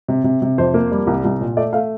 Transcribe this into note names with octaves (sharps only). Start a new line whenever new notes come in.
C3
C3
C3
F2 C5
A#3
G3
C2
C2
A#2
A3 D5
A3 F5